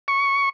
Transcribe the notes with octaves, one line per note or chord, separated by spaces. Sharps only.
C#6